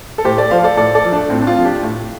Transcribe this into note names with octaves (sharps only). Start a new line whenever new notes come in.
A4
A2 G4 C5
A4 D5
F3 C5 F5
A4 D5
A2 A4 D5
A4 D5
F3
A3 D4
A2 C4
D4
C4 F4
F3
D4 G4
A2